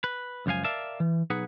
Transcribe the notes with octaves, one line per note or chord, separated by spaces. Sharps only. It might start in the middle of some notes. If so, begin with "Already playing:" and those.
B4
C#2 F#2 F3 F5 G#5
A#4 D5 E5 F5 A5
E3
B1 D#4 G#4 B4 F#5